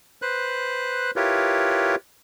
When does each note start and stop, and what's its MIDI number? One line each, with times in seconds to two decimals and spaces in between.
0.22 1.11 71
0.22 1.11 72
0.22 1.11 90
1.16 1.95 64
1.16 1.95 65
1.16 1.95 67
1.16 1.95 70
1.16 1.95 71
1.16 1.95 73